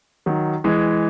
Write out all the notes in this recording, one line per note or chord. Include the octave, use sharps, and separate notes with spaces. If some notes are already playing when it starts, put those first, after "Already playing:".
D#3 F#3
E3 G#3